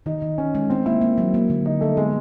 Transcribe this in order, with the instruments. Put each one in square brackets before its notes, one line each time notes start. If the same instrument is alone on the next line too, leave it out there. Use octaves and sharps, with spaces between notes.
[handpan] D#3 [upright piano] D#4
[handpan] D#3
[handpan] D#3 [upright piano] C#4
[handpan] G#3
[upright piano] C4 [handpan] D#4
[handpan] A#3 [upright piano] E4
[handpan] A#3
F#3
A#3
D3
[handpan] D3 [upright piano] D#4
[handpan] G3 [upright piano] A3
[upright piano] G#3 [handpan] B3